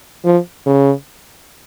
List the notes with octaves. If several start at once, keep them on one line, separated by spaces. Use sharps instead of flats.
F3
C#3